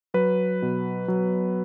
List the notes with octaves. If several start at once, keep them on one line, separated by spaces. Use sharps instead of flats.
F#3 B4
B2
F#3